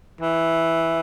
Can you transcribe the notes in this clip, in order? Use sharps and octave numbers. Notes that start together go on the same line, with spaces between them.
E3